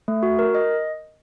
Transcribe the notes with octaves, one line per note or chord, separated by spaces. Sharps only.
A3
F#4
A#4
D#5